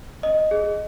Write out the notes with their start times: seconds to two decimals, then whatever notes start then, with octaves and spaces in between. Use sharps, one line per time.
0.23 D#5
0.51 G#4